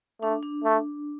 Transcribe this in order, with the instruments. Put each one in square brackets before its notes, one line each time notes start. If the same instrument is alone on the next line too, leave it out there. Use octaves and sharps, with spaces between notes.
[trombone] A3 [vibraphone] D4
[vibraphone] D4
[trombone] A3